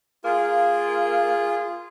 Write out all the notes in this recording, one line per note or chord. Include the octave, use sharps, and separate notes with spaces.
A#3 F4 G#4